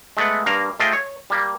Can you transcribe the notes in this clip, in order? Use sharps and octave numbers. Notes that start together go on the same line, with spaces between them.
G#3 A3 B3 F#5
G2 A#3 F5 A#5
A3 F4 G#4 C5 D#5 G5
C#5
G3 A#3